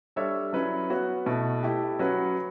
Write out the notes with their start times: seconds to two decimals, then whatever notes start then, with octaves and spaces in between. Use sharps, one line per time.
0.16 G3 D4 A4 C#5 E5
0.53 F#3 C#4 E4 B4 E5
0.90 B3 F#4 C#5
1.26 B2 A3 E4
1.63 A3 E4 G4
1.99 F#3 C#4 F#4 B4